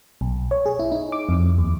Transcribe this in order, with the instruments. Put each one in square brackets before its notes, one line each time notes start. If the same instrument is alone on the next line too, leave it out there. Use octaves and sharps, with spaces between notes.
[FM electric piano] B1
C#5
G#4
E4
D#4
D6
F2
D#2